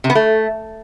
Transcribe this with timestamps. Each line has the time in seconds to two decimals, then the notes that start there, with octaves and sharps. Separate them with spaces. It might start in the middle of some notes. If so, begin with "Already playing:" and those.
0.04 C3
0.10 B3
0.15 A3